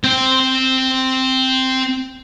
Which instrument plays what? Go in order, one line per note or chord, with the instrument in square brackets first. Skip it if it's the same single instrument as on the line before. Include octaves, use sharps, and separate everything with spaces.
[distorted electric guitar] C4 G5